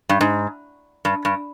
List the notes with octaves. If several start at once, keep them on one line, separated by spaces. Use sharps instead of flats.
G2
G#2
G2
G2